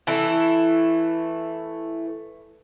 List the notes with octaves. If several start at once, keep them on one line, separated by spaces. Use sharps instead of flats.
E3 A3 E4